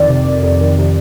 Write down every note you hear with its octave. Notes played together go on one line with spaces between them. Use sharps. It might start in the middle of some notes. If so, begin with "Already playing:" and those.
Already playing: F2 D#3 D5
C3
F2
F2
D#3
C3